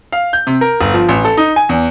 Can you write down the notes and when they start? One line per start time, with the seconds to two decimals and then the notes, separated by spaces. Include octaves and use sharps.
0.12 F5
0.33 G6
0.47 C3
0.61 A#4
0.81 G1
0.94 F3
1.08 A1
1.25 A4
1.37 D#4
1.56 G#5
1.69 E2